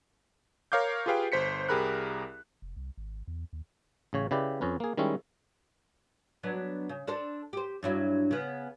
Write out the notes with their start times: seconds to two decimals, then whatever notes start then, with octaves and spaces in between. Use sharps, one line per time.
0.72 A#4 C#5 F5 D6 G6
1.06 F4 G4 G#4 B4 F5 G5
1.32 G1 C5 B6 C#7
1.69 C2 G4 G#4 A#4 B5 F#6
2.62 F1
2.76 C2
2.98 G#1
3.27 E2
3.53 D#2
4.13 A1 C#3 C#5
4.31 C#3 E4 G4 B4 D5
4.61 F2 C#4 B4
4.80 A#3 G#4
4.97 D#3 G3 G#3 C#4 E4
6.43 F#3 B3 D4
6.89 C#3
7.07 D4 A4 C5
7.53 G4 C5
7.83 G2 F#3 E4
8.31 C#3 B3